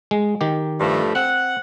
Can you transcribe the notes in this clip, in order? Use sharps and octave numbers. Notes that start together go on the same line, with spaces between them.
G#3
D#3 G4
G2 F3 A3
C4 F#5